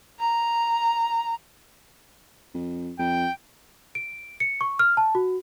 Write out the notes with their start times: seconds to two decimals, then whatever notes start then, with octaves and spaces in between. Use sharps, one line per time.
0.20 A#5
2.54 F2
2.99 F2 G5
3.95 D7
4.40 C#7
4.61 C#6
4.79 F6
4.97 A5
5.15 F#4